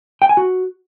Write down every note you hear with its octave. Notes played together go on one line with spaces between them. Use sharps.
G5
G#5
F#4